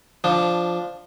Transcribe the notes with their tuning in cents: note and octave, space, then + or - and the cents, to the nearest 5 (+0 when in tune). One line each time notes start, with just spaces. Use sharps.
F3 +0 D4 +0